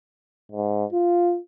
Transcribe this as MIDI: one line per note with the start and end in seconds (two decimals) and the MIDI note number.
0.52 0.85 44
0.93 1.39 65